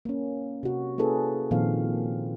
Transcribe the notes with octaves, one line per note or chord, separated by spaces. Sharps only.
A#3 C#4
C3 F#4
A#3 C#4 E4 G#4 A4 B4
A#2 D#3 F3 C4 F5